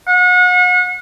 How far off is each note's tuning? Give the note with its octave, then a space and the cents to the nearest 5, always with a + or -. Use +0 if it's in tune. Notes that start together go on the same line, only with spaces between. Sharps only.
F#5 -35